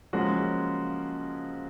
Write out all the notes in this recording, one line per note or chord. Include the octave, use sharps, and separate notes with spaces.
C#3 F3 F#3 G#3 A#3 C#4 F#4